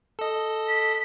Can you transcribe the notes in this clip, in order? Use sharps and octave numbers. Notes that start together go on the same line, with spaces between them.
A4 D#5
B6